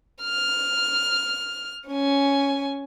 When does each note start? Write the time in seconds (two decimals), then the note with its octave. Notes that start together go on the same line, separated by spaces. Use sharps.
0.24 F6
1.89 C#4 G#5